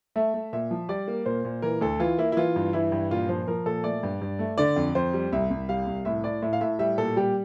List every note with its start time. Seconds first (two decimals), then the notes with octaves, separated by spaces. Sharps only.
0.16 A3 E5
0.34 A3
0.53 A#2 E5
0.71 F3
0.89 G3 D5
1.08 A#3
1.26 A#2 C5
1.45 A#2
1.62 E3 A#4
1.81 D2 A4
1.99 E3 F4
2.18 A#3 E4
2.32 E4
2.37 E3 F4
2.56 G2
2.73 E3 E4
2.92 G2
3.11 A#2 F4
3.29 F3 C5
3.48 F3 A#4
3.66 A#2 A4
3.84 A3 D5
4.03 G2
4.21 G2
4.39 A3
4.58 D3 D5
4.76 F2
4.95 F2 C5
5.13 G3
5.32 C2 E5
5.51 C2
5.69 G3 F5
5.87 C2
6.05 A2 E5
6.24 A2 D5
6.42 A2 E5
6.53 F5
6.61 A2 E5
6.79 G3 E5
6.98 A#2 A4
7.16 G3 G4